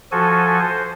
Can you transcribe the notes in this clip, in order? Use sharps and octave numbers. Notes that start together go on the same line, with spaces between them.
F3 F#4 A4 G#5
C5